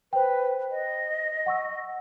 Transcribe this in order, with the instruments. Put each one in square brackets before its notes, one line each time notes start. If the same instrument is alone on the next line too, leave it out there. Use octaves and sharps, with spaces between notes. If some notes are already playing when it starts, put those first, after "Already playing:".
[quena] B4 [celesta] C5 G5
[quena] D#5
[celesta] F#5 C#6 E6